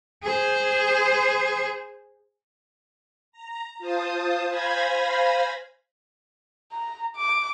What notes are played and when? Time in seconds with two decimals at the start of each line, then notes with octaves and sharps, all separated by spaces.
0.23 G#4 C5
3.32 A#5
3.79 F4 C5 A5 D#6
4.47 C5 F5 G#5 B5 G#6 A#6
6.72 A#5
7.16 D6